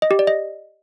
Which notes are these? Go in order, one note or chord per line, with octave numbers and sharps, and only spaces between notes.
D#5
G4
D5
D#5